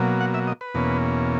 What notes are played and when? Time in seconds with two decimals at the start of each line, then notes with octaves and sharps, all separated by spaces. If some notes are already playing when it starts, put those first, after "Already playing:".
Already playing: B2 F#3 A#3
0.21 F#5
0.34 E5
0.47 D#5
0.61 B4
0.74 E2 B2 A#3 C#4